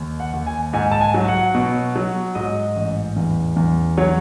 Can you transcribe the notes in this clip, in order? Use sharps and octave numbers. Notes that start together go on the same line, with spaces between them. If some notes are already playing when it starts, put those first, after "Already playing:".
Already playing: D#2
F#5
D#2
G#5
G#2 G#5
A5
G#5
F#3
F#5
B2
F#3
G#2 D#5
A1
E2
E2
F#3 C#5